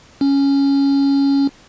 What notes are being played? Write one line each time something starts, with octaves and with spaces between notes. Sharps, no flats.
C#4